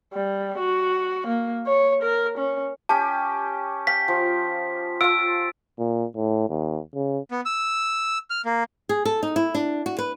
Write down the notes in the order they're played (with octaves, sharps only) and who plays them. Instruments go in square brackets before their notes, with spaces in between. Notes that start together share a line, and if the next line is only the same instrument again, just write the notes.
[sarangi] G3
F#4
A#3
C#5
A#4
C#4
[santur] C#4 G4 [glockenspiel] A5
[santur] F5 G5 [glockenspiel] B6
[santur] F3
[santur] F4 F5 [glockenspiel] E6 D7
[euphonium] A#2
A2
D#2
C#3
[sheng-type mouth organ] B3
E6
F6
A#3
[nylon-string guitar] G#4
A4
D#4
E4
D4
F#4
B4